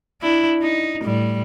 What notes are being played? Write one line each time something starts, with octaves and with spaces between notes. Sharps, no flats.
D4 E4
D#4
A2 G3